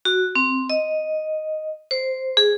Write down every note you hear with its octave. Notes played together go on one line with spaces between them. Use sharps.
F#4
C4
D#5
C5
G#4